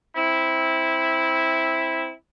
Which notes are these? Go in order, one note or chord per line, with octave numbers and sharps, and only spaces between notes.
C4 E4